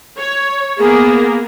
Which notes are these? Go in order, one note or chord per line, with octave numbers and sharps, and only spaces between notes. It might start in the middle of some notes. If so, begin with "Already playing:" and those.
C#5
A#3 B3 G#4 A#4